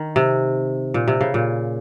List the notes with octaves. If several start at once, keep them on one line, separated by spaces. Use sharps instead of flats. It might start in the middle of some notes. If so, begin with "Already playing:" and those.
Already playing: D#3
C3
A#2
C3
C#3
A#2